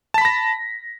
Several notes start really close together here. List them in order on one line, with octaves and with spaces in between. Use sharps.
A5 B6 B5 A#6